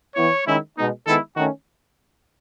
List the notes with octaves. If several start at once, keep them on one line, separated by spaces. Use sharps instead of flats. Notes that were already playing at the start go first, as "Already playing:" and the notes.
E3 B3 E4 C#5
D#3 G#3 C#4 E4
B2 G#3 B3 D#4
D#3 G#3 B3 E4 A4
D#3 A3 C#4 F#4